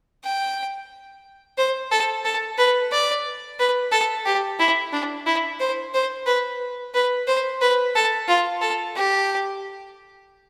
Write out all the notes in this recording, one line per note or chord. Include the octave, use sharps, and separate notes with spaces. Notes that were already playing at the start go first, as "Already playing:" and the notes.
G5
C5
A4
A4
B4
D5
B4
A4
G4
E4
D4
E4
C5
C5
B4
B4
C5
B4
A4
F4
A4
G4